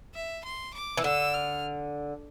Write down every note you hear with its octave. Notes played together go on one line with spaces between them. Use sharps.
E5
C6
D6
E3
D3 E6
F6